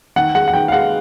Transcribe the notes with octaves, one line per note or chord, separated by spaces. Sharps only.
D#3 F#5
G#3 F#5
F#5
D#3 G5
F5
G#3 F#5